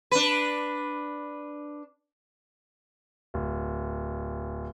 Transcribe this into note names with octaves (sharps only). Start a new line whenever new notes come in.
D4 B4
D1